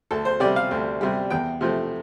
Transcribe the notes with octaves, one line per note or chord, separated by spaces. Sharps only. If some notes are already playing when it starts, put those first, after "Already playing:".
D2 A4
C5
C3 G3 D5
F5
D2
C3 G3
E2 G5
C3 F3 A3